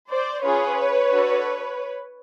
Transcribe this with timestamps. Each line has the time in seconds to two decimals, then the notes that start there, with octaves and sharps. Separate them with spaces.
0.10 C5 D5
0.44 C#4 F4 G#4 B4 C#5
1.12 D4 F#4 A4